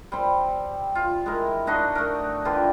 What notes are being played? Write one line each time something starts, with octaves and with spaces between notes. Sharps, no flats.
G3 C4 C6
F4
G#3 E4 A#4
D4 D#4 F#4 D#5
A3 A#4
D3 E3 F4 G4